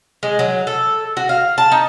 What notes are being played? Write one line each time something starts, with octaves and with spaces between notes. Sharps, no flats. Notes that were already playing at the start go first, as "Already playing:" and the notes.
G#3
F#3
A4
F#4
F5
A5
D#4